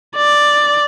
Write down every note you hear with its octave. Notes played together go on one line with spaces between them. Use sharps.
D5